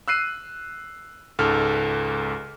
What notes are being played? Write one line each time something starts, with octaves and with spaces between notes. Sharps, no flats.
E6 F#6 C7 D#7
C#2 G#2 A4 F6